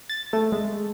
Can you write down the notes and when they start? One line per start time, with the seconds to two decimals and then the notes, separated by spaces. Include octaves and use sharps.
0.09 A6
0.33 A3
0.52 G#3